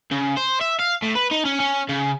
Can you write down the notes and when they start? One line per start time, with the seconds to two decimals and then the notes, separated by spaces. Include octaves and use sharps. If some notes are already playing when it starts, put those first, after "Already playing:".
0.12 C#3
0.37 C5
0.61 E5
0.80 F5
1.03 A2
1.16 B4
1.31 D#4
1.45 C#4
1.60 C#4
1.89 C#3